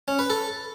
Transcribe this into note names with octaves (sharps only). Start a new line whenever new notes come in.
C#4
B4
A4